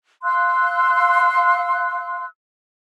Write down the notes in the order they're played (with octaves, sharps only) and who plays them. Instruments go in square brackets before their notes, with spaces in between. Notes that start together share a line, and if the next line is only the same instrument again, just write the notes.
[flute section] F5 C6 E6 F#6